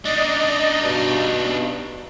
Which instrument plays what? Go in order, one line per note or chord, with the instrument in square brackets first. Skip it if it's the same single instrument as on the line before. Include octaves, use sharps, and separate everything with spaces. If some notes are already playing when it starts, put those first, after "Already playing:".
[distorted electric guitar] D4 D#4 [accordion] D5 D#5
[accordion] G2 B2